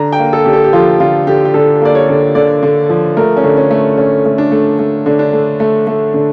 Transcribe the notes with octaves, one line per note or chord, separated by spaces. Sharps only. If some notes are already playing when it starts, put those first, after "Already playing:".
Already playing: D3 A#5
G5
A#3
A4
D3 G4
A4
G4
F3 F4
D3 F4
D3 G4
G4
D3 A4
A#3 D5
C#5
D3
D3 D5
D3
F3
A3 A#4
C#4
D3
C#4
A3
D3 C#4
A3
D4
A3
A3
D3
D4
A3
A3
A3
D3